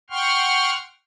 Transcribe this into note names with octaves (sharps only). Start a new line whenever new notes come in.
F#5 G5 C6 C#6 F6